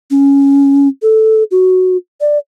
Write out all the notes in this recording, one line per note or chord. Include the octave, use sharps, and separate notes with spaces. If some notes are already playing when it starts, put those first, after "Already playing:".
C#4
A4
F#4
D5